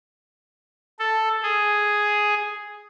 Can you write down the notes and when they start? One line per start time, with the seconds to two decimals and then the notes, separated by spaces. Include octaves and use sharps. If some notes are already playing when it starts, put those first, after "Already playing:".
0.99 A4
1.43 G#4